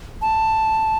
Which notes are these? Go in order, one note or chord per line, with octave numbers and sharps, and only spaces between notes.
A5